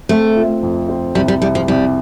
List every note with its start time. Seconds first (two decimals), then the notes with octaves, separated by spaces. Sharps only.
0.09 A3 C4
0.36 F4
0.63 F2
0.89 C4
1.15 C2 G3
1.28 G3
1.41 C2 G3
1.55 F3
1.68 C2 G3